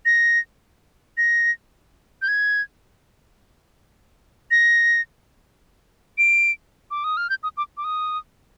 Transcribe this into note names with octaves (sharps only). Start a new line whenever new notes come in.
A#6
A#6
G6
G#6
A#6
D7
D6
D#6
F6
G6
D#6
D6
D6
D#6